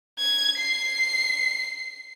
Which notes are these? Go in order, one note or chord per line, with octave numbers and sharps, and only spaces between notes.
G#6
C7